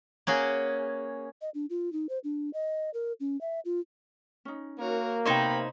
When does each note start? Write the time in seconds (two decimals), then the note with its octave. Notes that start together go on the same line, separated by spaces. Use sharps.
0.27 A#3 C#4 F#4 G#4
1.41 D#5
1.54 D4
1.70 F4
1.93 D#4
2.09 C5
2.24 D4
2.54 D#5
2.94 A#4
3.20 C#4
3.41 E5
3.65 F4
4.45 C#4 D#4
4.79 A#3 F#4 A#4 C#5
5.25 C3 B3 D#4 C5 C#5 D#5 G5 B5